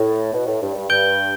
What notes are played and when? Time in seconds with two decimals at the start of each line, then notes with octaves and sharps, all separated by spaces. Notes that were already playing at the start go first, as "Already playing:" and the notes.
Already playing: A2
0.33 B2
0.46 A2
0.61 G2
0.75 G2
0.89 G2 G6 D7 G7